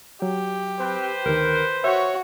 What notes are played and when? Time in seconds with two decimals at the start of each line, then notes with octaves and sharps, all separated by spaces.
0.22 F#3 G4
0.80 C4 B4 C5
1.26 D2 D#3 A#4
1.84 F#4 C#5 E5